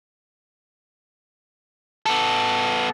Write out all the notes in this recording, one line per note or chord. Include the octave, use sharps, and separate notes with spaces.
B3 A4